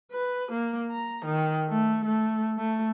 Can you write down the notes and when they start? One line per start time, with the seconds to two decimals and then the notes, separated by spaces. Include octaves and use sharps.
0.12 B4
0.52 A#3
0.92 A#5
1.26 D#3
1.70 A3
2.05 A3
2.58 A3